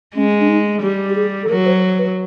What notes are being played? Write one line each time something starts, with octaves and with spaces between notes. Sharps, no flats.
G#3 C#4
D4
D#4
G3 G4
G4
G#4
A4
F#3 A#4
C5
B4